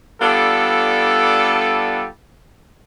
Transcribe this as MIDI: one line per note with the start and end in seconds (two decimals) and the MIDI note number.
0.21 2.06 55
0.21 2.06 59
0.21 2.06 62
0.21 2.06 65
0.21 2.06 69